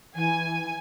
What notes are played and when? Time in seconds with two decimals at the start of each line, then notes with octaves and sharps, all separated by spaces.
0.15 E3 G#5